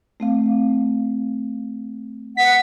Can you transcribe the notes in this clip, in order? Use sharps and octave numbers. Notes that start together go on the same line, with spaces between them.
A3 C4 F5
F#5 B6